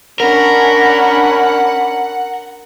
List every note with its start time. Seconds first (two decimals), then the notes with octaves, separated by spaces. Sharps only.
0.20 C#4 D4 A#4 F#5 B5